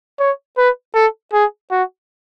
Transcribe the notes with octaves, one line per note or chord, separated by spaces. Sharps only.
C#5
B4
A4
G#4
F#4